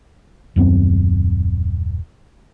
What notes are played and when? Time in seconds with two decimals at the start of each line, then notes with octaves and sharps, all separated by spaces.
0.56 D#1 F#2 B3 C4